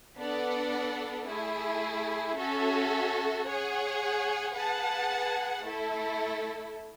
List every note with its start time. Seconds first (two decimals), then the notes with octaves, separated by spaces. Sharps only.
0.19 B3 D4 A4 D5 F#5
1.28 A3 E4 G#4
2.37 C#4 F#4 A4 E5
3.45 G#4 C#5 F#5
4.55 G#4 B4 F#5 A5
5.64 A3 E4 A4